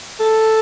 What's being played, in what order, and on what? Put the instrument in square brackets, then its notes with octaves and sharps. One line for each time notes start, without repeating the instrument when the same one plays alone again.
[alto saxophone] A4